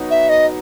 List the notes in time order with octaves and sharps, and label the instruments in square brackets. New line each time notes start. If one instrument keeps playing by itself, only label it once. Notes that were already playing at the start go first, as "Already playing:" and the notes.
Already playing: [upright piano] F#3 B3 D#4
[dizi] E5
D#5